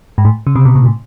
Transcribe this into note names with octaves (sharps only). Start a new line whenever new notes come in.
G#2
A2
C#3
C3
B2
A#2
A2